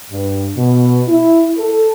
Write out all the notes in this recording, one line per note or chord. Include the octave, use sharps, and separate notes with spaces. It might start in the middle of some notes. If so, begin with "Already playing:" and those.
G2
B2
E4
A4